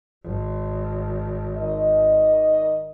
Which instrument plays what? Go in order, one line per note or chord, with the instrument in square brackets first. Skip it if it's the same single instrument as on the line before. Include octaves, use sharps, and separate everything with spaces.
[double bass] G#1
[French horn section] D#3 D5 D#5